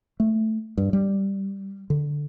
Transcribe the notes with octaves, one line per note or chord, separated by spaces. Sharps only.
A3
G2
G3
D3